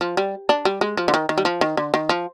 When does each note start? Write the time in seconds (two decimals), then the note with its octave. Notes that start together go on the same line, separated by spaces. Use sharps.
0.01 F3
0.17 G3
0.49 D4
0.65 G3
0.81 G#3
0.97 F3
1.08 D3
1.14 D#3
1.29 D#3
1.38 G3
1.45 F3
1.61 D#3
1.77 D3
1.94 D#3
2.09 F3